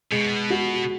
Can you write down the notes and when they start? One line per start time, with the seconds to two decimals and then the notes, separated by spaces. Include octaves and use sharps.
0.11 B2 G#3
0.50 F#4